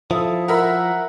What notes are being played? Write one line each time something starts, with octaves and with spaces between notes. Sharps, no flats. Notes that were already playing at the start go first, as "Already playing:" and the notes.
F3 E4 A4 D#6
A#4 E5 F#5 B5